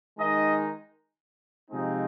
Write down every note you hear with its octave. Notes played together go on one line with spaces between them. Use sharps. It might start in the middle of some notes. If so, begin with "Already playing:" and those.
D#3 G#3 D#4 D#5
C3 F3 G#3 C4 D#4